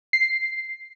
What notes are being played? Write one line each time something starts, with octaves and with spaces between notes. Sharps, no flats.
C7